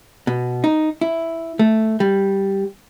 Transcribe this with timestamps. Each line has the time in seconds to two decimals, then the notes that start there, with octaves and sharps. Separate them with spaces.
0.27 B2
0.64 D#4
1.01 E4
1.59 A3
2.00 G3